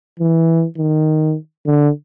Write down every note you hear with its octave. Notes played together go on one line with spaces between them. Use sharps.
E3
D#3
D3